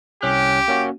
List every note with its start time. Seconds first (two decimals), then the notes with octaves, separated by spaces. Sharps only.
0.23 C2 C#4 G4 F#6
0.68 A#3 C#4 F#4